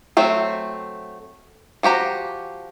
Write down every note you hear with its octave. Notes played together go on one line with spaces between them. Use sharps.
F#3 A3 C4
F3 F#4 G4 A#5